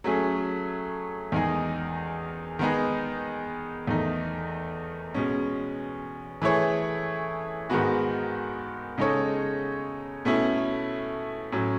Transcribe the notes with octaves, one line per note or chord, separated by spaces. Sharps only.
F#3 A3 C#4 G#4
E2 D#3 G#3 D#4 G#4
D#3 G#3 B3 D#4 G#4
E2 D#3 A3 D#4
B2 G#3 C#4
E3 A3 E4 G#4 C#5
G#2 D#3 G#3 B3 F#4
C#3 G#3 D#4 A4 C#5
B2 A3 C#4 E4
A2 F#3 C#4